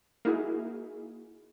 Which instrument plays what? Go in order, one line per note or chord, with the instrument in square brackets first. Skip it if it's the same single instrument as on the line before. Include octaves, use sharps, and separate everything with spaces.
[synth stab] A#3 D#4 E4 F#4 G#4